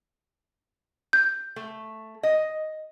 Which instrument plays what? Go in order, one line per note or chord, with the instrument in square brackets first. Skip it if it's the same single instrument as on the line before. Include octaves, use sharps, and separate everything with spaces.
[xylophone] G6
[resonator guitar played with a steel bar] A3
D#5